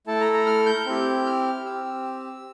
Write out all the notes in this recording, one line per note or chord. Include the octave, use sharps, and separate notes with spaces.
A3 E4 A4 A5
A#5
A#5
F6
G6
C4 E4 G4
F6
C4 G4 E6